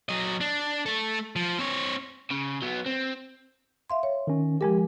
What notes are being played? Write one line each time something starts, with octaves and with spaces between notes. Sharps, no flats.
F#3 D#5
D4
A3 A4
F3
C4 C#5
C#3
F#3 B3
C4
E5 F5 C6
C#5
D#3 C#4
F3 G#3 G4 A#4 G#5